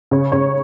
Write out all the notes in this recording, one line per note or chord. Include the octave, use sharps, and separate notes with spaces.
C#3 C#5
C#3 C#5